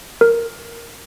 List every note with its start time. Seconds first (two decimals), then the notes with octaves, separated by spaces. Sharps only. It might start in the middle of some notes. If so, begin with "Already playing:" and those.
0.21 A#4